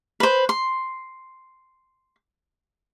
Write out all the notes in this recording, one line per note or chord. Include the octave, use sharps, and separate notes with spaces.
B4 C5
C6